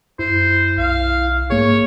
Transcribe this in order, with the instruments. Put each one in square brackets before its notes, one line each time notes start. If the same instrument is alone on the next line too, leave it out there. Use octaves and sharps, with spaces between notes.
[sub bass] F#2 [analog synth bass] E4 [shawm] C5
[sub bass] B1 [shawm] F5
[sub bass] G#2 [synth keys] A#3 G#4 [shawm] C#5